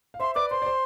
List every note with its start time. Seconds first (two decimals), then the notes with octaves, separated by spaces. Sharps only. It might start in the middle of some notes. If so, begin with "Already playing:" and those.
0.14 F5
0.20 C5 E5 C6
0.35 B4 D5 D6
0.50 C5 C6
0.62 D5
0.66 C5